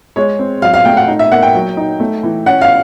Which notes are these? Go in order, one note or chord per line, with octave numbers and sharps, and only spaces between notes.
G#3 C#5
C4
F#3 F5
F5
A3 G5
F#5
D#4
E5
A#3 F#5
G5
F#3
D#4
A3
E3
C#4 F#5
F5